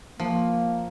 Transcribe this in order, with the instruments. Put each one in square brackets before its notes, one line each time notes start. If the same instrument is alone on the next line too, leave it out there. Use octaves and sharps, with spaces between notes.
[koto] F3 [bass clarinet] A#3